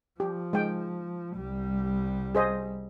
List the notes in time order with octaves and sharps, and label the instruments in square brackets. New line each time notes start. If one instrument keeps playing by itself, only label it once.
[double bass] F3 [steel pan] G4
[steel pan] G#3 G5
[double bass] C2 G3
[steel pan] G#4 C5 D#5